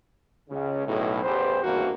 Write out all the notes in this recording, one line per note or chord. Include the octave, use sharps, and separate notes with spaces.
C#2 C#3
B1 A2
A1 E2 G4 B4 C5
G#1 E2 G2 E3 A#3 F#4